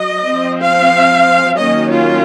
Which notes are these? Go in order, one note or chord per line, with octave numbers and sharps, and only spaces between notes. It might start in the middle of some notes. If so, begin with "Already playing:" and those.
Already playing: F#3 D#5
F3 C4
F5
D#3 F#3 A#3 C#4 D#5
F4